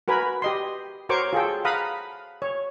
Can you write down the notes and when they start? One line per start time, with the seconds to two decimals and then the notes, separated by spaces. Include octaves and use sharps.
0.08 F#4 A#4 B4 G#5 B5
0.42 G4 D#5 C6
1.09 F#4 A#4 C5 C#5 C#6 D6
1.33 F4 G#4 A4 G5
1.65 F5 F#5 A#5 B5 D#6
2.42 C#5